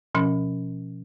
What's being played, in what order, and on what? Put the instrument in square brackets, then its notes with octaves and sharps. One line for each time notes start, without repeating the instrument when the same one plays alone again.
[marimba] B2 F3 C#4